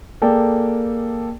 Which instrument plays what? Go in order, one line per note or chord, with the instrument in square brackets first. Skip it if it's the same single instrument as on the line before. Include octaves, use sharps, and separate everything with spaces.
[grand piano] A#3 G#4 A4 D5 G5